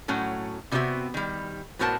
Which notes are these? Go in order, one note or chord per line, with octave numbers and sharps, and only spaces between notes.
A2 F#3 A3 C#4 F#4
C3 G3 B3 C4 F#4 E5
D#3 G3
A2 B3 F#4 A#4 C5 A5